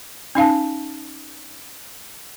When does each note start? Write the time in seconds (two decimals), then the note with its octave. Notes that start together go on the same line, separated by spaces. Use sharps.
0.35 C#4 D#4 F5 A5